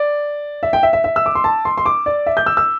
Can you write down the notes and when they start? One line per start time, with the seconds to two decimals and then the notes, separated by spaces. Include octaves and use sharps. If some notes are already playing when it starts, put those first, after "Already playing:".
Already playing: D5
0.63 E5
0.73 G5
0.83 E5
0.93 E5
1.04 E5
1.16 E6
1.26 D6
1.35 C6
1.44 A5
1.65 C6
1.78 C6
1.86 D6
2.06 D5
2.26 E5
2.37 G6
2.46 E6
2.57 E6